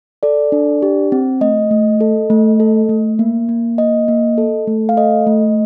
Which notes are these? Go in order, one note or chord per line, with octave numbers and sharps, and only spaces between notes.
A4 D5
D4
G4
C4
A3 D#5
A3
A4
A3
A4
A3
A#3
A#3
A#3 D#5
A#3
A4
A3
F5
A4 D#5
A3